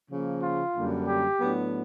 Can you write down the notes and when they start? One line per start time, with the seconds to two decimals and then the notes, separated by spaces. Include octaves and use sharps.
0.10 C#3 F3 A#3
0.43 F4
0.75 F#2 D3 G3 A#3 D4
1.07 G4
1.39 A2 F#3 B3 D4